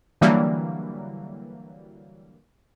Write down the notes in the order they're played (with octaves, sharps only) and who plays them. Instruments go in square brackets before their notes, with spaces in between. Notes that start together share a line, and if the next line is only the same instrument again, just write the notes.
[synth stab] D3 E3 F#3 G3 A#3